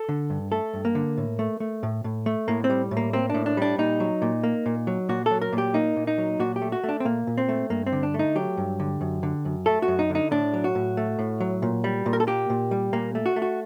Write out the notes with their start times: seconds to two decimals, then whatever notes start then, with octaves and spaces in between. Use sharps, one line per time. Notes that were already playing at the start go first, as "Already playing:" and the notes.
Already playing: A4
0.09 D3
0.30 G2
0.52 A3 A4
0.74 G2
0.85 A#3
0.95 D3
1.17 A2
1.39 A3
1.60 A3
1.83 A2
2.04 A2
2.26 A3
2.48 A2 A#3
2.64 C4
2.70 G3
2.91 A2
2.97 A#3
3.13 A#3 C4
3.30 A2 D4
3.46 D4
3.57 G3 D4
3.78 A#2 D#4
4.00 F#3
4.22 A#2
4.43 A#3
4.66 A#2
4.87 F#3
5.09 A#2 F#4
5.26 F#3 A4
5.42 A#4
5.53 A#2
5.58 G4
5.74 A#3 D#4
5.96 A#2
6.07 D#4
6.18 F#3
6.40 A#2 F#4
6.56 G4
6.62 A3
6.72 F#4
6.84 A3
6.89 D4
7.00 C4
7.05 A#2 A#3
7.27 A#2
7.38 C4
7.49 A3
7.70 G2 A#3
7.87 C4
7.92 D3
8.03 D4
8.14 A3
8.19 D#4
8.35 F#3 G4
8.57 G2
8.80 D3
9.01 F#2
9.23 D3
9.45 F#2
9.66 A3 A4
9.82 F#4
9.88 F#2
9.99 D#4
10.10 D3
10.15 D#4
10.32 A2 D4
10.54 F#3
10.64 F#4
10.75 A2
10.97 A3
11.19 A2
11.40 F#3
11.62 A#2
11.84 G3
12.06 A#2
12.13 A#4
12.20 A4
12.27 A#3 G4
12.50 A#2
12.71 G3
12.93 A#2 A#3
13.15 A3
13.26 F#4
13.36 A3
13.42 F#4